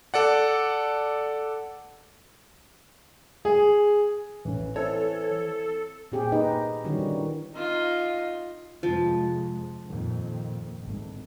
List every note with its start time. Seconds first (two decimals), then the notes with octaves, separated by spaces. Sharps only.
0.14 A4 D5 F#5
3.45 G#4
4.45 A1 E3 C#4
4.76 C4 E4 A4 C5 C#5
6.12 A#2 C4 G4 G#4
6.32 D#4 G4 B4 D#5
6.84 D3 D#3 G3 C#4 F#4
6.99 E3
7.54 D#4 F4
8.83 F2 C3 F3 G#3
9.87 F2 A#2 D#3
10.84 G#1 D2